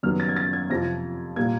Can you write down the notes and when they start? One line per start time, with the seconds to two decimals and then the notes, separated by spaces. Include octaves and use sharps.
0.03 F#1 F#2 D#3 G3 B3 F6
0.20 A6
0.29 G#6
0.36 A6
0.53 G#6
0.70 F2 C3 F3 A#6
1.36 A#2 G3 A#3 G#6